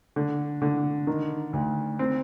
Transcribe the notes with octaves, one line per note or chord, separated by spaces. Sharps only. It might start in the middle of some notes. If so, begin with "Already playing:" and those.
D3
D3
D#3
D2
C4